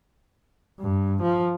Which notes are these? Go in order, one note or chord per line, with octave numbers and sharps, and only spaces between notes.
G2
F3